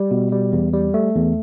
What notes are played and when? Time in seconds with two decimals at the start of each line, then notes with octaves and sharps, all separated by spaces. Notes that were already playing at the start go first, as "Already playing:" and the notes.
Already playing: G3
0.11 B2
0.32 G3
0.52 E2
0.73 G3
0.94 A3
1.15 E2